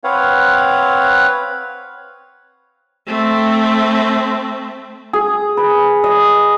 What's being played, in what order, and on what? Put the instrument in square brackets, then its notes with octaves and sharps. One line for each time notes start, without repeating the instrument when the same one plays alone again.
[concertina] C4 B4 C#5 F5 F#5
[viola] A3 C4
[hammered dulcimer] G#4
B4
D#5